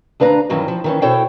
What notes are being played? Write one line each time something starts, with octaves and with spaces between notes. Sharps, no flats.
D2 D4 B4 F5 A#5
G2 D#3 E3 F#3 C#4 D#4
F3
D#3 E3 C#4
B2 E4 A4 C5 C#5 G5